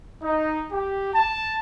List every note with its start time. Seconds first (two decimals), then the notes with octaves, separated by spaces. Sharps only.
0.23 D#4
0.71 G4
1.14 A5